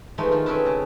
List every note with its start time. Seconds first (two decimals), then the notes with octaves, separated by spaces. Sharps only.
0.18 E3 F3 G#3 A3 D#4
0.31 D#3 E3 F4
0.46 C4 C#4 G#4 A4 B4 A5
0.66 C#3